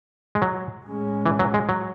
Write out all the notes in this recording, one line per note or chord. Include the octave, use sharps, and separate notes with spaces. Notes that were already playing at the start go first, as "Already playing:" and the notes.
G#3
F#3
A2 G#3 C#4
E3
F#3
G#3
F#3